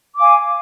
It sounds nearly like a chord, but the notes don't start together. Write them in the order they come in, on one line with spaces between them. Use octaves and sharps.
D6 F5 G#5